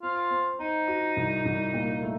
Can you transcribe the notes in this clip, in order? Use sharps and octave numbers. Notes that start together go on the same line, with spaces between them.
C4 F4
C4
C4 D#4
F#4
C2
C2
A#2
A3